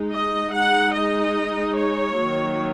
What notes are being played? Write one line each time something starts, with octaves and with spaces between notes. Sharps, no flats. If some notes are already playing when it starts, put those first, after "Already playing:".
Already playing: G#3 D#4
D#5
G#3 D#4 F#5
D#5
C#5
D#3 F#3 A#3